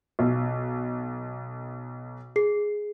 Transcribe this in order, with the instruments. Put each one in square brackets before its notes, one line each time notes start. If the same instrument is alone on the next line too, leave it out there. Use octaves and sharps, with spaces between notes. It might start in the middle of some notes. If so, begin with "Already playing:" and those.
[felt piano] B1
[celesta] G#4 C7